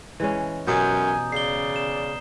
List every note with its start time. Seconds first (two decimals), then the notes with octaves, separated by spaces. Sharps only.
0.20 E3 G#3 C#4
0.67 F#2 B2 G4 G#5 A#5 D#6 G6
1.32 C#3 D5 C7 G7
1.76 E7